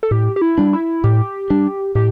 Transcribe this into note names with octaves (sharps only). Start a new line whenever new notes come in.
A4
A2 G4
G4
E4
G3 D4
E4
A2 G4
G3 D4
A2 G4